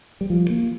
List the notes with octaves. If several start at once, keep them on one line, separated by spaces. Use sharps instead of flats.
G3
F3
A#3